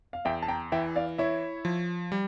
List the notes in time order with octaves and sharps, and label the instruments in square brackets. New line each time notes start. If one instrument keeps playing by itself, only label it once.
[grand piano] F5
[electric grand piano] E2 [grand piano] E5 G5
[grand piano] A5
G5 A#5
[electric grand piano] E3 [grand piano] E5 G5
[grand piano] D5 F5
[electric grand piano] E4 [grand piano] C#5 E5
[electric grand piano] F3
G3